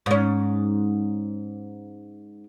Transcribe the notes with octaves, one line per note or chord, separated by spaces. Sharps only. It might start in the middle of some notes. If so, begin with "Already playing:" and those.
G#2 C#4